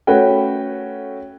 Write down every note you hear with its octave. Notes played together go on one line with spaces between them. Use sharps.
A3 C#4 F#4 B4 G5